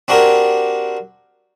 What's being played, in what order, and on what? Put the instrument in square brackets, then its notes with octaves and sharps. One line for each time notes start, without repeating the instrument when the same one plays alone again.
[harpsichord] C4 D4 F#4 G4 A#4